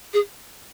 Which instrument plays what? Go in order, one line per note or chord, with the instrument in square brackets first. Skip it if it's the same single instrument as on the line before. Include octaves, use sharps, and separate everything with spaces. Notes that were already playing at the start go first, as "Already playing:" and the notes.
[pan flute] G#4